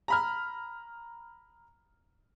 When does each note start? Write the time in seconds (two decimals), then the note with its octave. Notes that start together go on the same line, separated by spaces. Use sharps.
0.08 A#5 B5 F6